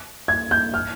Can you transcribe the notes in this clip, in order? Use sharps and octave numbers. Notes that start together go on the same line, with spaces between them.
G#6
G6
F6